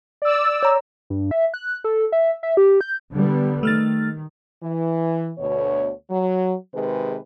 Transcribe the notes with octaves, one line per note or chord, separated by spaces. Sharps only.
D5 E6
C#5 A#5
G2
E5
F#6
A4
E5
E5
G4
G6
D3 G3 B3
D#3 A3 F6 A6
E3
D2 B2 C#5
F#3
C3 D#3 G#3 G#4 B4